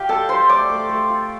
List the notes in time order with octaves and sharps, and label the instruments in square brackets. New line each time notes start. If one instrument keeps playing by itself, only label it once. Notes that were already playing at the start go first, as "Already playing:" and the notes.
Already playing: [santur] F4 G4 D#5 F5 G5
G3 A4 A5
D4 C5 C6
A3 D5 D6
A3
A3
F4